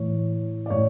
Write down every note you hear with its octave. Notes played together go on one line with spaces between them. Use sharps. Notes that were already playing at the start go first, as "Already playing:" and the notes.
Already playing: A2 E3 C#5
D5
A2 C#5